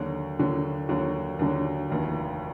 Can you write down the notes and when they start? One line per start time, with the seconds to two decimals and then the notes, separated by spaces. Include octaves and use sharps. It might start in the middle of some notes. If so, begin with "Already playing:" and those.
Already playing: D#2 D3 F#3
0.39 D#2 D3 F#3
0.89 D#2 D3 F#3
1.39 D#2 D3 F#3
1.90 F1 D#2 D#3